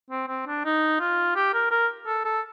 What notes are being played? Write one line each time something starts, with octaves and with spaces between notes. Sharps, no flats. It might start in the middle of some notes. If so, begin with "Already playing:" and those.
C4
C4
D4
D#4
F4
G4
A#4
A#4
A4
A4